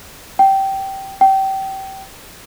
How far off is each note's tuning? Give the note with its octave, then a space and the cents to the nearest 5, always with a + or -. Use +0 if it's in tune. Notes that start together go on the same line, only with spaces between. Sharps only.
G5 -15
G5 -25